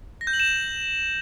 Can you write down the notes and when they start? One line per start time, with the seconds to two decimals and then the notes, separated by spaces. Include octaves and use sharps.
0.21 A#6
0.27 G6
0.33 F#7
0.40 E7